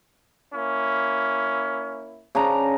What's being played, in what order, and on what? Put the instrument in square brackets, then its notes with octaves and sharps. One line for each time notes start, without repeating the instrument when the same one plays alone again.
[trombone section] A#3 C#4 E4
[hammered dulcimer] C#3 D4 A#5